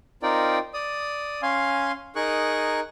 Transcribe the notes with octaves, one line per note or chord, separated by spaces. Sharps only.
C4 D#4 F4 A#4 D5 G5
D5 D#6
C#4 F5 G#5 C6
D#4 G#4 A#4 C#6 F#6